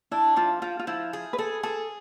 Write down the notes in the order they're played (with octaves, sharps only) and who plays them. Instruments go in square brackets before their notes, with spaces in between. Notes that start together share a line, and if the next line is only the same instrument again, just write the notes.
[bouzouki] D4 [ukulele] E4
[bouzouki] F3 [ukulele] F4
[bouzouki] F3 [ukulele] F4
[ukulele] F4
[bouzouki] F3 [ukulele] E4
[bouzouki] G#4
[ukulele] B4
[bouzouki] G#4 [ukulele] A4
[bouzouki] G#4 [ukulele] A4